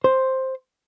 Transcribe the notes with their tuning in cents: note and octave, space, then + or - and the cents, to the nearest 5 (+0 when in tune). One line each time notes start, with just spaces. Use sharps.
C5 +5